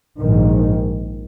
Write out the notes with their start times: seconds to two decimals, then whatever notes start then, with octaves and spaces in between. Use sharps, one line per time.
0.20 A#1 G#2 D#3